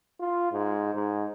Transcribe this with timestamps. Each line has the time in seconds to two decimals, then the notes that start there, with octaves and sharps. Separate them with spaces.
0.20 F4
0.52 G#2
0.95 G#2